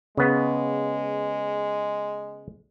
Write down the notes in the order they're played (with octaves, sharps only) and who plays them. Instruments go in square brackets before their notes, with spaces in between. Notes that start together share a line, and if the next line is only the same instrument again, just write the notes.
[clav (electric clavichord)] C#3 B3 [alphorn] G#3